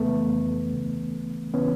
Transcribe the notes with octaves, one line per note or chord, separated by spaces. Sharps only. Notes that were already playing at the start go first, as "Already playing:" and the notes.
Already playing: F2 C#3 E3 A3 B3
D2 C#3 E3
C#3 E3 B3 C#4